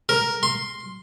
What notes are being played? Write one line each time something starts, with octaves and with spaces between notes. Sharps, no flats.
A#4
C6